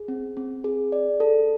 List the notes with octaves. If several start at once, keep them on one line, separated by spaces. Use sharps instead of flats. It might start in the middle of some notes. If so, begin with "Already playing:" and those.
Already playing: G#4
C4
C4
G#4
D5
A4